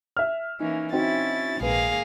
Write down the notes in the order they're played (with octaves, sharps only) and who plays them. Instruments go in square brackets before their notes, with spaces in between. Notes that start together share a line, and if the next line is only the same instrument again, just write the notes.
[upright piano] E5 F6
[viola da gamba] E3 A#3 C#4 [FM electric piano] D#4
[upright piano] C4 [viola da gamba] C#4 E4 [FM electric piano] D#4 F#4 [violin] A6
[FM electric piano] A#1 B4 [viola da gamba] G#2 D#3 A#3 [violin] G#4 F5